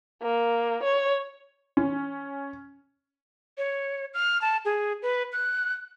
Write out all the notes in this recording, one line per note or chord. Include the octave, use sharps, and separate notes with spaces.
A#3
C#5
C#4
C#5
F6
A5
G#4
B4
F#6